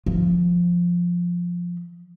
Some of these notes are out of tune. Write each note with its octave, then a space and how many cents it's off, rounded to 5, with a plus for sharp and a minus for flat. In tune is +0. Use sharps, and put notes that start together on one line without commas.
F3 +5